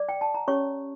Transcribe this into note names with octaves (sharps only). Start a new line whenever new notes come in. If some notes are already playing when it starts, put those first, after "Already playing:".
Already playing: D5 D6
G5
A5
A#5
C#4 G4 C#5 C#6